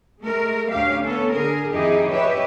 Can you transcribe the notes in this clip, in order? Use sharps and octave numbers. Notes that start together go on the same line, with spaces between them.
G#3 A3 A#4
D2 C#4 G4 F5
B3 C#4 A4
D3 G#4 A#4
F2 D#3 D#4 E4 G4 G#4
G4 B4 C#5 D#5 E5